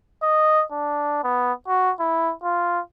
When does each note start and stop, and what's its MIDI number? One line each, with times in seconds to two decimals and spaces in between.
0.23 0.64 75
0.72 1.19 62
1.24 1.53 59
1.68 1.92 66
1.99 2.33 64
2.43 2.80 65